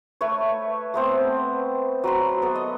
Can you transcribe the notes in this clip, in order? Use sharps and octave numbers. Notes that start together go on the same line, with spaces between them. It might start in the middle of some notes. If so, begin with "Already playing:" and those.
A3 B4 C#5
A3 B3 C4
F#3 B5 C6
B3 A4
D#5